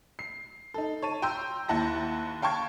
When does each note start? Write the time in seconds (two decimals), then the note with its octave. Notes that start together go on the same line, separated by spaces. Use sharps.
0.19 C7
0.74 D#4 A4
1.02 C#5 A5 D#7
1.22 G5 A#5 C6 E6 G6
1.68 D#2 E4 F#5 A5 A#6
2.42 F5 G5 A5 C#6 G#6